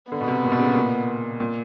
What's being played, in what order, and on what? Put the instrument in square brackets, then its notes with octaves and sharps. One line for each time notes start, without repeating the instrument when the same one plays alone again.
[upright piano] D3 [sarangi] B3
[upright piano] B2
C3
A#2
B2
C#3
C3
A#2
A#2